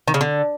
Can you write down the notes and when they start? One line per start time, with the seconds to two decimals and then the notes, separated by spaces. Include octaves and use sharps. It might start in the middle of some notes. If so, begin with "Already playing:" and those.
0.08 D#3
0.14 C#3
0.21 D3